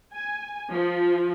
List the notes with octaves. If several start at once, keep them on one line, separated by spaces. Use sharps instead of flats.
G#5
F3